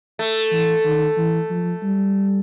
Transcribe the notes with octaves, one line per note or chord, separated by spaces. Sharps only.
A3
E3
D#3
E3
F3
G3